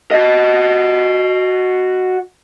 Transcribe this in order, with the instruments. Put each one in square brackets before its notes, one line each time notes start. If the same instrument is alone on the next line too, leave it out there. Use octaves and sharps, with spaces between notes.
[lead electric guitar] F#4 D#5